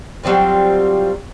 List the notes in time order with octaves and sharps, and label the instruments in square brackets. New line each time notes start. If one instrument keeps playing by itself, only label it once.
[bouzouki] F#3 G3 C4 F4